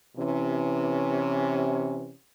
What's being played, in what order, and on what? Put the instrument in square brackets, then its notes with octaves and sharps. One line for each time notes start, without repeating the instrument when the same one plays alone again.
[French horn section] C3 E3 C#4